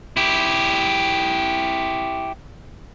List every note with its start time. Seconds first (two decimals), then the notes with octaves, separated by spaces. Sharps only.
0.17 E4 G4